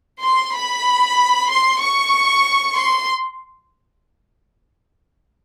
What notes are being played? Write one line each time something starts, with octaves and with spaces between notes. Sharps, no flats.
C6
B5
C6
C#6
C6